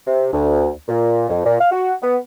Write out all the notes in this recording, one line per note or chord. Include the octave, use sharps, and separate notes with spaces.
C3
D2
A#2
F2
A#2
F5
F#4
B3